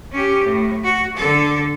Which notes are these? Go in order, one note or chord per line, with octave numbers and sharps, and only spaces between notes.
C#4 G4
A2
F#4
D3 A4